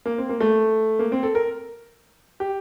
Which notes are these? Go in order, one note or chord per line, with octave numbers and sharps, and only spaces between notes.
A#3
C4
A#3
A3
A#3
C4
A4
A#4
G4